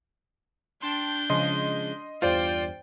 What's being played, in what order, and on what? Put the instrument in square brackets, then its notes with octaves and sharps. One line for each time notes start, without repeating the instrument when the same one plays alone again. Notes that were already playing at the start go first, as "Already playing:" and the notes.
[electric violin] D4 G6 [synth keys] G5 A5 C6
[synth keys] C#3 F3 G#3 [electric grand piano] D#5 C6
[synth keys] E2 G2 [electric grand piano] F4 C5 D5 [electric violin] G5